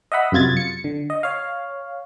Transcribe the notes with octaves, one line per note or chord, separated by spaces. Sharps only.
D#5 E5 F#5 B5
F#2 C3 F4 G#6 A6
C#7
D3
D#5
C#5 F5